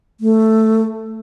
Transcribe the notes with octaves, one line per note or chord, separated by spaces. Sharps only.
A3